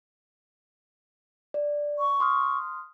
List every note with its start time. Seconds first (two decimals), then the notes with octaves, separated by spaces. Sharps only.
1.54 D5
1.99 C#6
2.20 C6 D#6 F6